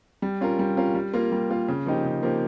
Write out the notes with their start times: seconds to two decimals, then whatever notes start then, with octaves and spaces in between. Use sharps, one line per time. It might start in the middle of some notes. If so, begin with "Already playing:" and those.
0.22 G3
0.41 C#4 F4 A#4
0.59 G3
0.77 C#4 F4 A#4
0.95 G3
1.13 A#3 F4
1.32 G3
1.50 A#3 F4
1.68 C#3
1.86 F3 A#3 D#4 G4
2.04 C#3
2.23 F3 A#3 D#4 G4